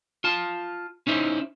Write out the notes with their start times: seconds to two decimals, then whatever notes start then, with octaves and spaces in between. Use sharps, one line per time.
0.24 F4 A5
1.07 C#4 D#4 E4 C5